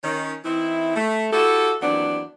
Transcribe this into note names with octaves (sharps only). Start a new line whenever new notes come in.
D#3 C#4
E3 C4 D#4 E4
A3
E4 F#4 G4 A4
D#2 E3 F#3 B3 C4 D4